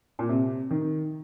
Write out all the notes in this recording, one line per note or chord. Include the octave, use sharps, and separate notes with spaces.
A#2
C3
D#3